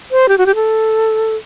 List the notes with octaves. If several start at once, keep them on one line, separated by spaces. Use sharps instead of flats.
C5
G4
F#4
G4
A4